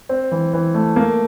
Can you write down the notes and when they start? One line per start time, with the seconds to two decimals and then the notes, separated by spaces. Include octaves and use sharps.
0.09 C4
0.32 E3
0.53 E3
0.74 A3
0.96 A#3